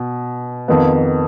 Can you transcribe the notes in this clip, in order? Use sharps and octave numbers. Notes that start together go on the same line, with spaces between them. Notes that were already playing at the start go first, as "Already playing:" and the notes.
Already playing: B2
F2 D#3 B3